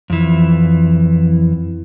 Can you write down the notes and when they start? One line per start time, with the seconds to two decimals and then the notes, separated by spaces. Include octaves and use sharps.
0.10 F2 E3